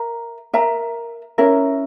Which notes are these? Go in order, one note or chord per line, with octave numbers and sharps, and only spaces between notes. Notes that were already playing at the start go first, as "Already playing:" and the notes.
Already playing: A#4 E5 A#5
A#4 E5 A#5
C#4 E4 A#4